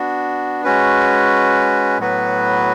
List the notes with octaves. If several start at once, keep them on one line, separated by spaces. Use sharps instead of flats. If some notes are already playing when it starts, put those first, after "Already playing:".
Already playing: B3 D4 F#4
G#3 C#4 F#4 B4
A2 F#3 B3 F#4 B4